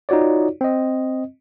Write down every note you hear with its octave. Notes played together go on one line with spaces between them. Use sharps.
D#4 F4 F#4 C#5 D5
C4 D#5